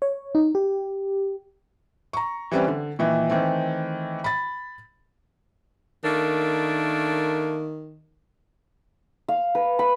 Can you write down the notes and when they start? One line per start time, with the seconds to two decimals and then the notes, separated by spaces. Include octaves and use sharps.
0.02 C#5
0.35 D#4
0.55 G4
2.13 A#5 C#6
2.52 E3 G3 C4 C#4 B4 D5
2.68 D3
2.99 A#2 D#3 E3 E4
3.29 D#3 E3 A3 C4
4.24 B5 A6
6.04 D#3 A3 A#3 D4
9.28 F5
9.55 B4
9.79 B5